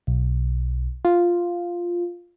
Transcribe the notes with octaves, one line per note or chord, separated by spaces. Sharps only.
B1
F4